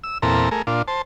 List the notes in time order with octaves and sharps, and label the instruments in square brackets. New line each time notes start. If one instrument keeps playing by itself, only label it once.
[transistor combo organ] E6
E2 A#2 C4 A4 A#5
A3 G#4 A#4
A#2 D4 F4
C5 A5